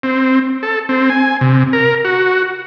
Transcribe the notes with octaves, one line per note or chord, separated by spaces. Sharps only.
C4
A4
C4
G#5
C3
A#4
F#4